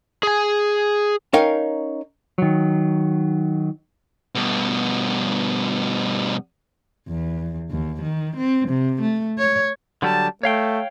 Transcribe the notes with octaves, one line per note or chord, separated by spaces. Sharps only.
G#4 G#5
C#4 D#4 A#4 F5 G5
D#3 F#3
G2 B2
E2
D#2
D#3
C4
C3
A3
C#5
D3 F#3 G3 A5
A3 C#5 F5 G5